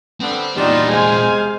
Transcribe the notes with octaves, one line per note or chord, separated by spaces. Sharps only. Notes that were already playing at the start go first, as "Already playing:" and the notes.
D3 G3 B3 C4
E2 A#2 G3 D4 D#4 F4 F#4
C3 G#3 C5 F5 G#5